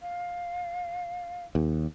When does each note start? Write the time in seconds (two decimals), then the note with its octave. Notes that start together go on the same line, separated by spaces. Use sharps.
0.02 F5
1.55 D#2